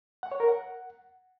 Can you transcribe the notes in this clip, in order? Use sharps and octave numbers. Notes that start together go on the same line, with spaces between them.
F#5
C#5
A#4
F#5